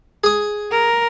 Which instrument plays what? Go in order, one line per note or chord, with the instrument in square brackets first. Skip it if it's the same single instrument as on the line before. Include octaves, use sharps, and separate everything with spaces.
[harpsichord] G#4 D#6
[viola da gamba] A#4